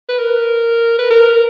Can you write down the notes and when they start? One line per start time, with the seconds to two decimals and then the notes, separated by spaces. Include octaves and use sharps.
0.09 B4
0.19 A#4
0.99 B4
1.11 A#4